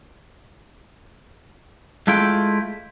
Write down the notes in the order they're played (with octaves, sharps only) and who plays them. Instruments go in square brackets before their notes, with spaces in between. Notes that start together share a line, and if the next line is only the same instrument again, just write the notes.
[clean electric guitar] G#3 A3 E4 F4 G5